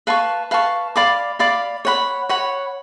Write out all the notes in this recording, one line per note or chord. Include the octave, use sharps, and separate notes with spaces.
B4 F5 A5 C#6
B4 F5 A5 C#6
D5 F5 B5 D6
D5 F5 B5 D6
C#5 F#5 B5
C#5 F#5 B5